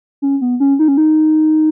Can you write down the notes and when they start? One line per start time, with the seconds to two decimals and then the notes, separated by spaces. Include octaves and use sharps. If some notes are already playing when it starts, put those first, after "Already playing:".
0.22 C#4
0.41 B3
0.60 C#4
0.79 D#4
0.88 C#4
0.97 D#4